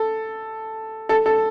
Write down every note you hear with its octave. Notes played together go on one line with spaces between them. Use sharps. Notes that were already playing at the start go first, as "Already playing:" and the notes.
Already playing: A4
A4
A4